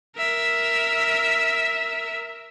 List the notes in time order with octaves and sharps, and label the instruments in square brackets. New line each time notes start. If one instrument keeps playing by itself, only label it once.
[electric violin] A#4 E5